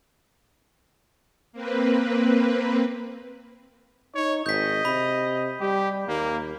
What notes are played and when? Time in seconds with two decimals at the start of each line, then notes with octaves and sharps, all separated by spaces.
1.52 A#3 C4 B4
4.15 D#4 C#5
4.46 G#1 D#5 G6 B6
4.85 C3 B5
5.60 G3 G4
6.08 D#2 A#3